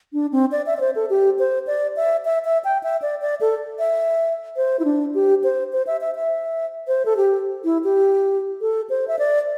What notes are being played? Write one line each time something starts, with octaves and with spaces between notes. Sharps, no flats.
D4
C4
D5
E5
D5
C5
A4
G4
C5
D5
E5
E5
E5
G5
E5
D5
D5
A4
E5
C5
E4
D4
G4
C5
C5
E5
E5
E5
C5
A4
G4
E4
G4
A4
C5
E5
D5